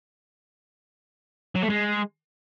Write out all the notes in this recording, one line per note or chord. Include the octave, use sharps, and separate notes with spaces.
F#3
A3
G#3